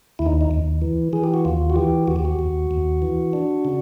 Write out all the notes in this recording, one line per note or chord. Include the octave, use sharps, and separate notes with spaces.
D#2 E4
D#4
D#4
D#2
E3
E3 G#4
G4
F#4
D#2 F4
F#4
E3 G4
D#2 F#4
G4
F#4
D#2
D#2
E3
D4
C#3